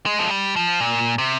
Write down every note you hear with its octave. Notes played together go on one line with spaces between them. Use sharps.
G#3
F3
G3
F3
A#2
C3